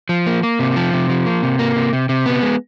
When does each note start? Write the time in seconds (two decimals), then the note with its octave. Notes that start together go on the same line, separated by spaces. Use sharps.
0.09 F3
0.27 A#3
0.43 A#3
0.59 C3
0.76 F3
0.93 C3
1.10 F3
1.26 A#3
1.43 C3
1.59 A#3
1.76 C3
1.93 C3
2.09 C3
2.26 B3
2.42 G#3